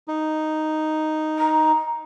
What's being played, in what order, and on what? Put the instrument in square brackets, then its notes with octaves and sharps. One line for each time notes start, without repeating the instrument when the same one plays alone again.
[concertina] D#4
[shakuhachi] A#5